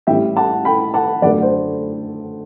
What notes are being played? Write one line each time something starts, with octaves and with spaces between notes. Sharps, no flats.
A1 A2 G3 E5 G5
F#5 A5
G5 B5
F#5 A5
F#2 D3 A3 D5 F#5
A4 C5